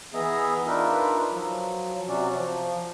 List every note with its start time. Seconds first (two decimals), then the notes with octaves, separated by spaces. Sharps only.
0.14 E3 B3 G#4 D#5 E5 A#5
0.67 D4 D#4 F4 A#4 B4 E5
1.31 F3 F#3
2.08 C3 F#3 C#4 F#4 D5
2.37 F3